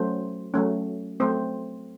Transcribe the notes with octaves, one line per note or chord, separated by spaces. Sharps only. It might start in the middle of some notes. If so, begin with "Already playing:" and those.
Already playing: F#3 A3 C#4 C5
F#3 A3 C#4
F#3 A3 C4 C5